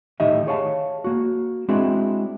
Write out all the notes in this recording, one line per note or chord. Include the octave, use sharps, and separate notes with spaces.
A2 D#3 D#4 G4 D#5 E5
G#4 C#5 F5 A5
A#3 F#4
G#3 C4 D4 E4 F#4 G#4